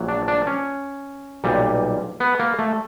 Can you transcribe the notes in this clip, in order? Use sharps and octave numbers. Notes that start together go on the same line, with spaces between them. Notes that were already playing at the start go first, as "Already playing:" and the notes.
Already playing: A#1 A#2 F#3
D4
D4
C#4
B1 A#2 G3
B3
A#3
A3